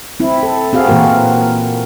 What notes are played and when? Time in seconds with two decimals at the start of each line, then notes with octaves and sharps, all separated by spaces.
0.20 C4 E4
0.43 A4
0.73 C4 F#4 G#4 F5
0.88 A#2 E3 A#3 F#4 A#4